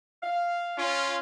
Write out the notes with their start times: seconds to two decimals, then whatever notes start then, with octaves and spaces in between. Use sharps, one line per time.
0.23 F5
0.77 C#4 F4